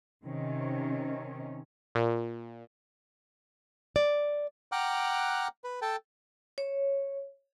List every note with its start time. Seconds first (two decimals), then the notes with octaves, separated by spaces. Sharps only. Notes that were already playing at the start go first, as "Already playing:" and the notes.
0.24 C3 D#3 C#4
1.95 A#2
3.96 D5
4.72 F#5 G5 A#5 D6 F6 F#6
5.64 B4
5.82 A4 G5 A5
6.58 C#5